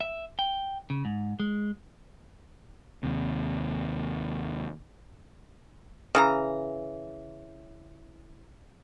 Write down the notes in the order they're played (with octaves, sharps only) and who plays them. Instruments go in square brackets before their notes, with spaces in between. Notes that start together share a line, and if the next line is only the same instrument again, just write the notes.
[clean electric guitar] E5
G5
C#3
G#2
G#3
[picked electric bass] D#2 C3
[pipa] C#3 E3 A#5